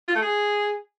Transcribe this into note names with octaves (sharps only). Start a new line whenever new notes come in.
F4
A3
G#4